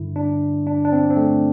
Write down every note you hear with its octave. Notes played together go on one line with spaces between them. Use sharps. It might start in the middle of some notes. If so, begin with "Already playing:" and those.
Already playing: G2 D3 E4
D4
D4
D4
C4
C4
A3